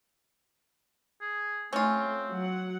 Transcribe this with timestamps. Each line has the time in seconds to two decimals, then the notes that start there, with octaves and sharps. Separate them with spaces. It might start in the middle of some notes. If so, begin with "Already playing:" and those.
1.21 G#4
1.73 A3 C4 C#4 F4
2.30 F#3 F#5